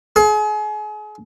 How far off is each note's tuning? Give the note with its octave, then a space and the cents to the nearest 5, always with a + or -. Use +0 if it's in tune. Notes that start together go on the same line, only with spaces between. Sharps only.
G#4 +35